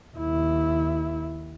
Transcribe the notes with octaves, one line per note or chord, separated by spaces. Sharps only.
D#2 E4